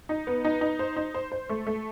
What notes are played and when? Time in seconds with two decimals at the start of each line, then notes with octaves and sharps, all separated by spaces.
0.09 D#4
0.27 B3
0.45 D#4
0.61 D#4
0.79 C5
0.96 D#4
1.14 C5
1.32 C5
1.49 A3
1.67 A3